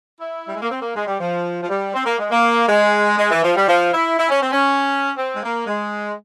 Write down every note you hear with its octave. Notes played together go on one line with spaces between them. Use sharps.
E4
G3
G#3
A#3
C4
A#3
G#3
G3
F3
F3
G3
C4
A#3
G#3
A#3
G#3
G#3
E3
F3
G3
F3
E4
E4
C#4
C4
C#4
C4
G#3
A#3
G#3